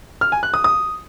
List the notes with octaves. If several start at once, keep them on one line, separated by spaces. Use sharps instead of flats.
F6
G#5
F#6
D#6
D#6